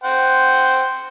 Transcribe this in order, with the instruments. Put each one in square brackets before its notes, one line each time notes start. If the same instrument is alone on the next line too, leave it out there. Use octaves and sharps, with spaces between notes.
[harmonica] C5 F#5 G5